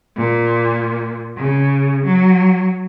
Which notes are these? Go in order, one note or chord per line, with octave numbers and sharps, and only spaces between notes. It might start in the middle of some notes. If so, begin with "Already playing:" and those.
A#2
C#3
F#3